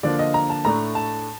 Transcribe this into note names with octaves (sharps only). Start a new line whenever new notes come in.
D3 F3 A#3 D4 D5
D#5
A#5
A5
A2 A3 D4 A#5
A5